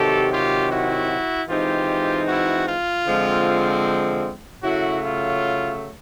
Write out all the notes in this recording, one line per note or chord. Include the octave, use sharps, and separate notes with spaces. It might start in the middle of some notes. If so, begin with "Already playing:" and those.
Already playing: C3 D#3 F#3 G4 A4
F4 G4
E4 F#4
E3 G#3 C4 D#4 F4 G4
E4 F#4
F4
D3 F3 G#3 C4
C#3 F#3 A3 E4 F#4
F4